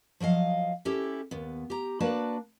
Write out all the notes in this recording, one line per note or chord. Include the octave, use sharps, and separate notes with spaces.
F3 F#3 D#5 F5
C#4 E4 G4 A4
D#2 B3
G4 A#5
A#3 D4 F#4 B4 D5 A5